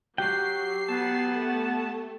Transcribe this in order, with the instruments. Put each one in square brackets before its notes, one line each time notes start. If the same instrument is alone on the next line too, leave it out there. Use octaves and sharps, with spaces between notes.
[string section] F#3 C7 [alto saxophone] F#4 [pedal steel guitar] G4 G5
[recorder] B3 [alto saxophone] A5
[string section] A3